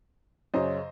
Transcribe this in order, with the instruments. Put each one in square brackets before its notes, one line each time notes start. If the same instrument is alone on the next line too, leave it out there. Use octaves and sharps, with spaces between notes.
[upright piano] F#2 C#3 F#3 C5 D#5